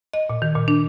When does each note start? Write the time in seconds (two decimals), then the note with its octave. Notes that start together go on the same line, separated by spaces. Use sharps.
0.14 D#5
0.30 A#2
0.42 D#3
0.55 A#2
0.68 D4